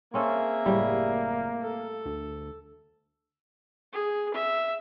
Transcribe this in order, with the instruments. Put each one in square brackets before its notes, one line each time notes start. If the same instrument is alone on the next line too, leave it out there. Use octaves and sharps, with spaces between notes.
[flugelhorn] A#3 [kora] C4 C#4 A4 [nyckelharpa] G#4 E5
[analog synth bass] F#1 [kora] A2 G3
[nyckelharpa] A4
[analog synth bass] D2
[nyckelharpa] G#4
E5